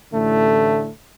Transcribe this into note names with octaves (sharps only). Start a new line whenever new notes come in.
A1 A2 D3 A3